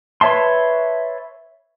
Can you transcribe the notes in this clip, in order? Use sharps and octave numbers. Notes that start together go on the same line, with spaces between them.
B4 C#5 E5 A5 C6